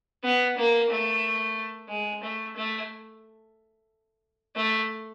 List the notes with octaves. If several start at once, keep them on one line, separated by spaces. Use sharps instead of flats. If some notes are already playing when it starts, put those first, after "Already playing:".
B3
A#3
A3
G#3
A3
A3
A3